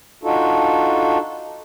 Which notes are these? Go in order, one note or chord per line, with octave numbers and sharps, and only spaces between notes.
D4 D#4 F4 F#4 A4